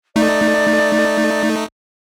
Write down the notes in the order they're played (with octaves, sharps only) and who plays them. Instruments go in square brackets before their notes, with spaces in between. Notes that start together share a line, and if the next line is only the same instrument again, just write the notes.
[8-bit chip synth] A3 D#4 [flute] D5